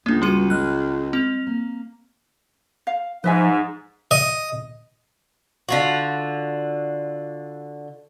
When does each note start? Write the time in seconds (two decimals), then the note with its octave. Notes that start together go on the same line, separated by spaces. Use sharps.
0.06 C#2 A3 A#3 D4 E5
0.22 G3 B3 F#4 G#4 D#7
0.50 G#3 F6 F#6
1.13 C4 F7
1.47 A#3
2.87 F5
3.24 G#2 F3 D#4 B4 E5 G#5
4.11 D#5
5.69 D3 F4 F#4